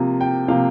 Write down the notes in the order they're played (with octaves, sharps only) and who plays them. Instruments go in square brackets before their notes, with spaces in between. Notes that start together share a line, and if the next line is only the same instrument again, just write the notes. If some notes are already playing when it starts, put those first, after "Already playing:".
Already playing: [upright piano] C3 F3 A#3
G5
C3 F3 A#3 F5